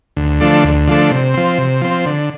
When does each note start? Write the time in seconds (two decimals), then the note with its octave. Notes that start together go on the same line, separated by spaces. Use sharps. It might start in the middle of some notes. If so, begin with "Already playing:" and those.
0.17 D2
0.40 D3 F3 A3 D4
0.64 D2
0.88 D3 F3 A3 D4
1.11 C3
1.34 F3 C4
1.58 C3
1.82 F3 C4
2.06 D3